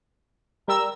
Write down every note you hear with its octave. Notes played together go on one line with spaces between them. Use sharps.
G3 A#4 E6